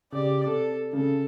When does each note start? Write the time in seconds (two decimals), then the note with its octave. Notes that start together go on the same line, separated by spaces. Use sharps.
0.13 C#3 G4 D5
0.46 C3 A4
0.93 C#3 A4